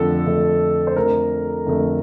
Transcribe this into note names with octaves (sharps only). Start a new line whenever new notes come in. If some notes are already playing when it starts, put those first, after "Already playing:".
Already playing: F2 D3 F3 A3 A4
F2 D3 F3 A3
C5
F2 D3 A3 A#4
F2 D3 A3